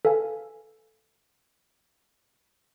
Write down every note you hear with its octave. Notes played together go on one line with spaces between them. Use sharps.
A4 B4 F5 G#5